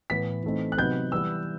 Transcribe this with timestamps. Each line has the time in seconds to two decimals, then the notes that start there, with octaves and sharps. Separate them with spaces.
0.10 A2 E3 B3 B6
0.44 E3 A3 C4 D#4
0.72 F#6
0.77 C3 F#3 B3 D#4 G6
1.12 E3 G3 B3 E6